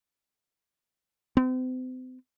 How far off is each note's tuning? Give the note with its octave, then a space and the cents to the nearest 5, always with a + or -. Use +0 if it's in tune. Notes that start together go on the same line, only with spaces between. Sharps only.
C4 -40